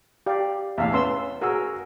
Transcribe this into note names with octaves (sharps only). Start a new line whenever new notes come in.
G4 D5 F5
E2 A2 E5 F5
B3 C#4 C6 E6
F#4 G#4 A#4 E6